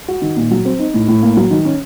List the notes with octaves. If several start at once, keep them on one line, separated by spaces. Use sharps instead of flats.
F#4
D#3
A#2
F#3
C4
D#4
A2
A2
A#3
F#3
D#3
C#4